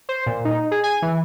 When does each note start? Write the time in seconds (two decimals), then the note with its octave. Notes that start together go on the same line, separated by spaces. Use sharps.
0.09 C5
0.26 A#2
0.45 D#4
0.71 G#4
0.83 G#5
1.02 E3